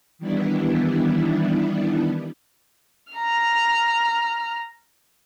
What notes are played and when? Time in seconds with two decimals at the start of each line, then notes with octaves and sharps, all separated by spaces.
0.19 D#3 E3 G3 B3 D4 E4
3.14 A#5 F6